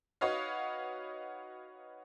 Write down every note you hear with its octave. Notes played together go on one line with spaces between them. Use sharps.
D#4 F#4 B4 C#5 D#5 F5